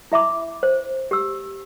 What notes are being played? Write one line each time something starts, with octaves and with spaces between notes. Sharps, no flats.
E4 E5 B5 D6
C5
G4 E6